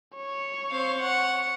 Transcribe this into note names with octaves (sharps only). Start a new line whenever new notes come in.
C#5
C4 F5
F#5